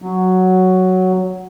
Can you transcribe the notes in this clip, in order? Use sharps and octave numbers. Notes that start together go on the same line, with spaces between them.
F#3